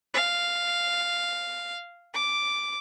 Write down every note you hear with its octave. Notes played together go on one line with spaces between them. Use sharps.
F5
D6